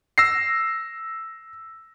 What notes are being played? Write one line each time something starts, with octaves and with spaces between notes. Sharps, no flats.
E6 A#6 C7